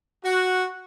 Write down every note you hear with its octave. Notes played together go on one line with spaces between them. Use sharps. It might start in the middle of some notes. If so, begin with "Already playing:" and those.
F#4